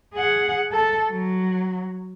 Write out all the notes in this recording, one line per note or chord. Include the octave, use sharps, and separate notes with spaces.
G#4 F#5
A4
F#3